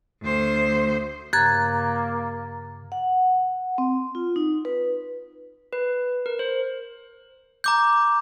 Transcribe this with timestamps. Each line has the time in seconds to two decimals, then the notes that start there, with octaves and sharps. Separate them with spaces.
0.22 D2 C5
1.33 G2 C#3 A#3 A#5 F#6 G#6 A6
2.92 F#5
3.78 C4
4.15 F4
4.36 D#4
4.65 B4
5.73 B4
6.26 A#4
6.39 C5
7.64 A#5 D6 G6